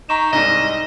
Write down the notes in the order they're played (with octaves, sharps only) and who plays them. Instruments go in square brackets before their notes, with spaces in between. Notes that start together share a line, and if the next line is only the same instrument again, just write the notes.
[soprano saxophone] D#4 [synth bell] A#5 C#6 E7
[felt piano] C2 G#2 D5 [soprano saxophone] D#5 [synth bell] D#7 E7